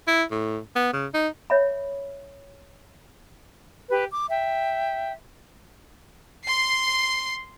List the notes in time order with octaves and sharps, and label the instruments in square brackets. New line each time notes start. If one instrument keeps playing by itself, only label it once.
[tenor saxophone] E4
A2
B3
C#3
D#4
[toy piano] C#5 E5 B5
[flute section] G4 B4
D6
E5 G5
[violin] C6 C7